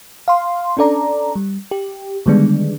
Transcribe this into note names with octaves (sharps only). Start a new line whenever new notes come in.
F5 C6
C#4 D4 A4 D5 A#5
G3
G4
D3 D#3 G3 G#3 B3 D4